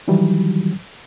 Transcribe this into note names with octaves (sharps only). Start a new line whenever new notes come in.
D#3 E3 F#3 G3